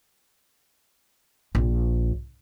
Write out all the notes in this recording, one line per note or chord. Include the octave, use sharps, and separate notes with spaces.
A#1